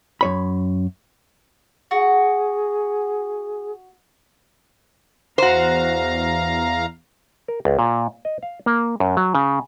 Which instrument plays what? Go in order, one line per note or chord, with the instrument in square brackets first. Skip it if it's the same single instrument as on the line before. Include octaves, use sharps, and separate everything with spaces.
[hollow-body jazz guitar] F#2 C#5 B5
[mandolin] F#4 [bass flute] G#4
[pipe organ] E2 F5 A#5 [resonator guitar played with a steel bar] F#4 C5
[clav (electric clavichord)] A#4
C#2
A#2
D#5
F5
A#3
F#2
F#3
C#3